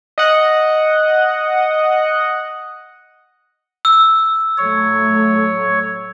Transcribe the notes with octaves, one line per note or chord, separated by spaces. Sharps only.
D#5 F#5
E6
A2 F#3 A3 C#5